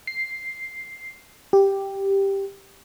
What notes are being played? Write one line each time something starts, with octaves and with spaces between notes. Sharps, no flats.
C7
G4